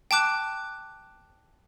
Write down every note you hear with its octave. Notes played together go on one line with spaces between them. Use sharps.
G5 A5 D6 F#6